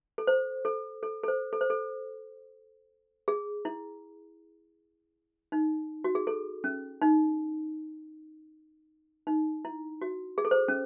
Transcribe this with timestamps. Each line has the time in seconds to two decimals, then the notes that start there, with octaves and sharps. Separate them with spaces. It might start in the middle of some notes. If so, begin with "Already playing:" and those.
0.18 A4
0.27 C5
0.65 A4
1.03 A4
1.24 A4
1.28 C5
1.53 A4
1.61 C5
1.70 A4
3.28 G#4
3.65 E4
5.52 D#4
6.04 F#4
6.15 G#4
6.27 A4
6.64 C#4
7.02 D#4
9.27 D#4
9.65 E4
10.02 F#4
10.38 G#4
10.45 A4
10.51 C5
10.68 C#4